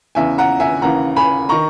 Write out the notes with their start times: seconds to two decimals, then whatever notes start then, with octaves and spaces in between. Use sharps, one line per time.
0.15 E2 C#3 E3 E5 G#5
0.38 F#5 A#5
0.60 E5 G#5
0.82 D#2 C#3 E3 F#5 A#5
1.16 G#5 B5
1.49 D#3 A#5 C#6